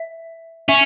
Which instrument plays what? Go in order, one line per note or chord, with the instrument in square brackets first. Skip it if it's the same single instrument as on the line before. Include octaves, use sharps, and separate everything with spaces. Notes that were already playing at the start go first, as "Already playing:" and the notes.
Already playing: [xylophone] E5
[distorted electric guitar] C#4 [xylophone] E5